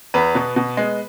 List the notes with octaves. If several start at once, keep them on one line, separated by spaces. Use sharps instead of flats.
E2 B4
B2 B3
B2
G#3 B3